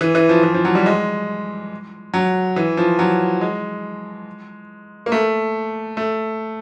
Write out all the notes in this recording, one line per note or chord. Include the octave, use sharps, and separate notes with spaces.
E3
E3
F3
E3
F3
F#3
G3
G#3
F#3
E3
F3
F#3
G#3
A#3
A3
A3